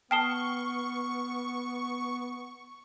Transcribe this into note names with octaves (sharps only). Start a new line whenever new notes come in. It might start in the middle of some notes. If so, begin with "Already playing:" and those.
B3 G5 A5 C#6 D#6 F6 C7 G7